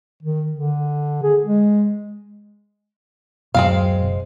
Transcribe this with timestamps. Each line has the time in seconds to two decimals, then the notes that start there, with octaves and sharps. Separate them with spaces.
0.22 D#3
0.52 D3
1.23 G#4
1.44 G#3
3.55 D1 F#2 B2 G#3 C4 F5
4.02 F#1